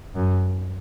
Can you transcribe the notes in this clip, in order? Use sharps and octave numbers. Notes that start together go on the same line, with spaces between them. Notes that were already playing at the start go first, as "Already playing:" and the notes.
F#2